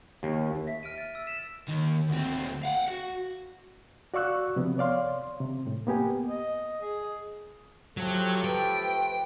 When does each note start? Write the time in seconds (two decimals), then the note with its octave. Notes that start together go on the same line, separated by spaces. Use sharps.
0.23 D#2
0.67 E5 A#6 B6
0.83 F6 D7 D#7
0.98 A6
1.15 E6
1.27 B6 E7
1.68 D#2 D#3
2.09 D2 C4
2.63 F5 F#5
2.88 F#4
4.14 F#4 D5 F5 C#6 E6 F#6
4.56 C3 F3 B3
4.78 C#5 D5 F5 C6
5.41 C3
5.67 A2
5.87 A#3 B3 G4 G#5
6.28 D#5
6.82 G#4
7.97 F3 F#3 A3 G4
8.45 B4 G5